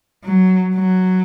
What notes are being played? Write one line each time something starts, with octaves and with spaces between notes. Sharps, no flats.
F#3
F#3